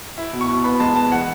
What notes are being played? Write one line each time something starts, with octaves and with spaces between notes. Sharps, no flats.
E4
B2
C#6
B2
B3 B5
G#3 A5
B3 A5
E3 F#5